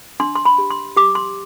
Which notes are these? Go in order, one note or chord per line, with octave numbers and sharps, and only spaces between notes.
D4 C6
C6
B5
G4
C6
G4 D6
C6